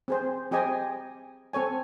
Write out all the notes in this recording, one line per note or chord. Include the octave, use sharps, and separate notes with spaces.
C4 G#4 C5
C4 G4 G#4 D#5 G#5
C4 A4 C#5 G#5